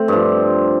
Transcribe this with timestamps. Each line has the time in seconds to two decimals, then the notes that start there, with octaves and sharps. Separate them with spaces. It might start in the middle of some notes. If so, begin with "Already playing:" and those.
Already playing: A3 C4
0.08 G2 F3